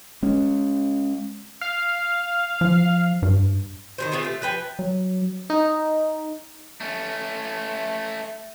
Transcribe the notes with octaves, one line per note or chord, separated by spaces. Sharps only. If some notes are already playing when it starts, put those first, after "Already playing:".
G#3 C#4
F5
F3
G2
D#3 F3 C5
B3 C4 F4 G#4
A3 G4
F3 B4 G5 G#5
F#3
D#4
A3 C#4